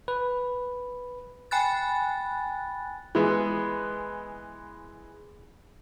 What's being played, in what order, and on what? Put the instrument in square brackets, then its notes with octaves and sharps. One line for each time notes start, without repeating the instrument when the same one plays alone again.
[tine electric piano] B4
[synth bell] G5 G#5 B5 F#6 A6
[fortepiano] E3 G#3 B3